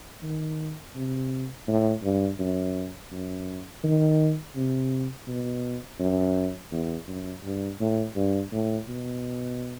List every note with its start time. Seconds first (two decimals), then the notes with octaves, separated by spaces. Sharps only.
0.23 D#3
0.95 C3
1.68 A2
2.03 G2
2.39 F#2
3.12 F#2
3.84 D#3
4.55 C3
5.28 B2
6.00 F#2
6.72 E2
7.07 F#2
7.44 G2
7.80 A2
8.16 G2
8.52 A2
8.88 B2